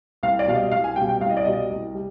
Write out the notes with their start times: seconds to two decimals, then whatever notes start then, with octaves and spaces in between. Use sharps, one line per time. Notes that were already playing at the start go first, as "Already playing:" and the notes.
0.23 C2 F5
0.39 D5
0.48 B2 F5
0.52 G3 D#5
0.72 C2 F5
0.84 G#5
0.96 B2 G3 G5
1.09 G5
1.21 C2 F5
1.30 D#5
1.37 D5
1.45 B2 G3 D#5
1.71 C2
1.95 G3